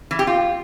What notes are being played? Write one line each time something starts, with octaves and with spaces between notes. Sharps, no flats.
E3
G4
F4